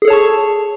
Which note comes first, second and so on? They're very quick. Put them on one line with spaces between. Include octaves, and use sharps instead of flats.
G#4 A4 C#5 A5 C#6